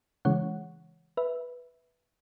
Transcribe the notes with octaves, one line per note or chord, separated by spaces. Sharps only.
C#3 E3 G#3 C#5 F#5
B4 E5